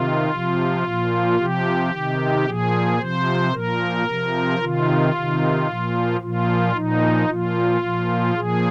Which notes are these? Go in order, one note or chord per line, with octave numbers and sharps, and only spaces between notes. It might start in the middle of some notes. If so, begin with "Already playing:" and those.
Already playing: C3 D#3 F4
C3 F3
A#2 F3
C3 F3 G4
C3 D#3
A#2 F3 G#4
C3 F3 C5
A#2 F3 A#4
C3 F3
C3 D#3 F4
C3 D#3
A#2 F3
A#2 F3 F4
A#2 F3 D#4
A#2 F3 F4
A#2 F3
A#2 F3 G#4